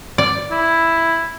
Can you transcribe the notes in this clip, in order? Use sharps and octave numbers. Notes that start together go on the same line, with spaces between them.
D5
E4